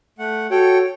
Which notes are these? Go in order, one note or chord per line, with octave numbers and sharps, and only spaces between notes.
A3 F#5
F#4 A4 C#5 G5